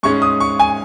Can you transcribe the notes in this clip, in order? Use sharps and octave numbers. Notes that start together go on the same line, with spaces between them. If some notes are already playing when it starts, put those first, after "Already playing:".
G#2 G#3 C#4 C#6
D#6
C#6
G#5